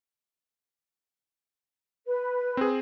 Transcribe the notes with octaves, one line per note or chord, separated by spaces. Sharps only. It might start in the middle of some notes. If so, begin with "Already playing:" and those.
B4
C4 G#4